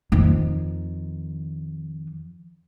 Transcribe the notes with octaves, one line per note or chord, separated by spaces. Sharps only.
F2 D#3